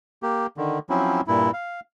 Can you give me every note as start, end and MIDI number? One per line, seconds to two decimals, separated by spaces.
0.23 0.47 58
0.23 0.47 67
0.57 0.79 50
0.57 0.79 51
0.90 1.21 53
0.90 1.21 54
0.90 1.21 60
0.90 1.21 61
0.90 1.21 64
1.27 1.51 43
1.27 1.51 46
1.27 1.51 64
1.53 1.80 77